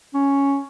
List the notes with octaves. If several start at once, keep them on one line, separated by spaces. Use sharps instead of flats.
C#4